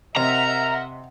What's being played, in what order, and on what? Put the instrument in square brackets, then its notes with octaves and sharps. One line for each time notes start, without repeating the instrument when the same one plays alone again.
[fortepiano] C3 [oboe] A#4 [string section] D#5 E5 F#5 [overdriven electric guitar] A#5